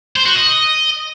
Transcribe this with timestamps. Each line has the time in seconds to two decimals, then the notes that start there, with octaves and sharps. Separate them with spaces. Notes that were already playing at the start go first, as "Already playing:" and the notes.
0.16 C5
0.26 F#4
0.36 D#5